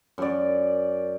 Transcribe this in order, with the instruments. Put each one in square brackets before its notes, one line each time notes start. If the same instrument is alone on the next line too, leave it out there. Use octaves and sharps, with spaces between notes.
[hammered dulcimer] F#2 D5